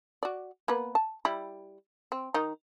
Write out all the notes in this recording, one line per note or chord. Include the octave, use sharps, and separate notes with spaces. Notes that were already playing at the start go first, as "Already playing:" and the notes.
F#4 D5
A#3 B3 B4
A5
G3 E4
C4
D#3 D#4